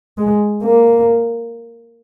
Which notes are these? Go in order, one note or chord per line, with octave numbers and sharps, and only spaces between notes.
G#3
A#3